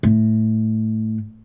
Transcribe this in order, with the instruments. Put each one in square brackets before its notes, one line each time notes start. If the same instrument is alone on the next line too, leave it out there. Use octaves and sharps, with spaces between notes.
[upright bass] A2